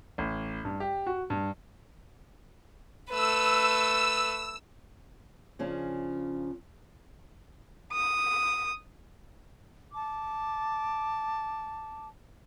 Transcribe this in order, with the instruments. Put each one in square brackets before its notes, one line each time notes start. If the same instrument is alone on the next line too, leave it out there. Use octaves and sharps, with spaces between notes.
[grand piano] A1
G2
G4
F#4
G2
[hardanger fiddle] A3 B4 [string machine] E6
[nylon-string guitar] C#3 F3 C#4 D4
[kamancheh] D#6
[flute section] A5 D6